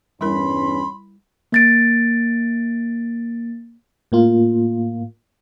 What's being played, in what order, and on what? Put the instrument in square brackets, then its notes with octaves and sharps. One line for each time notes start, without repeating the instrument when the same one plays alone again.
[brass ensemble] E2 G2 C#4 [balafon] G3 E4 A#4 [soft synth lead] B5 [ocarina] C6
[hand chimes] A#3 A6 D7
[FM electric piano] A2 A#3 F4